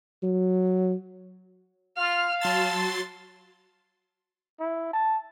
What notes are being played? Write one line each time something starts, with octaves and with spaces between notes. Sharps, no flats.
F#3
F4 F5 F6
F#3 A5 C6 E6 A6
E4
A5